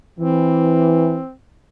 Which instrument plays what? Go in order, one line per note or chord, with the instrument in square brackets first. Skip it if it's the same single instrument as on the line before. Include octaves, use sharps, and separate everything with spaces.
[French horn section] E3 [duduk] C4